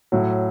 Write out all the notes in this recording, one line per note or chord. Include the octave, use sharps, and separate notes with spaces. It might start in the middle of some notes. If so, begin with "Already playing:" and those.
A2 F#3